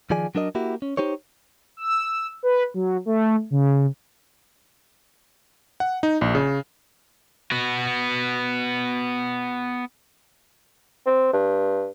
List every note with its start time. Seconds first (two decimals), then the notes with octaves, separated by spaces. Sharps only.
0.10 D#3 F3 G#4 D5 G#5
0.35 F#3 D4 A#4 D#5
0.55 A#3 E4 F#4 G4
0.82 C#4
0.97 D#4 G4 C5 C#5
1.77 E6
2.43 B4
2.74 F#3
3.06 A3
3.51 C#3
5.80 F#5
6.03 D#4
6.21 A#1
6.35 C#3
7.52 B3 F#4
11.06 C4
11.33 G2